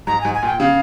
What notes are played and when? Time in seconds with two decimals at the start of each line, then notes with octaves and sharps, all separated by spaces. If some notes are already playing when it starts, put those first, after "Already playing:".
0.07 G#2 A#5
0.21 G#2 G#5
0.34 G#5
0.43 A#2
0.47 G5
0.60 C#3 F5